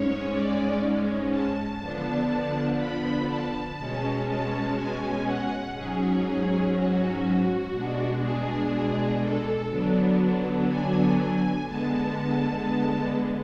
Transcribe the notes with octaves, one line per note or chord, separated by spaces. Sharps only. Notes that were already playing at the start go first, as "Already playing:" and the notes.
Already playing: G#2 G#3 C#4 C#5
D5
A5
D3 F3 B3 D4
B5
A5
B2 G#3 C#4
A5
G#5
F#5
G#2 F#3 C#4 G#4
F#4
B2 G#3 D4
G#4
A4
D3 F#3 B3 D4
G#5
G#5
D3 G#3 B3 A5